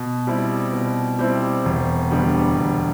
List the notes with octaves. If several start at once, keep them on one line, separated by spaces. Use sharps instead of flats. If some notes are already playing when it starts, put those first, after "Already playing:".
Already playing: B2
G3 C4 E4
B2
G3 C4 E4
E1
D2 D3 G3 B3
E1